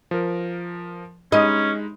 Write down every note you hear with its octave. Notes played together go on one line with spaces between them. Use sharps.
F3 A#4
G#3 C#4 D#4 D#5 B5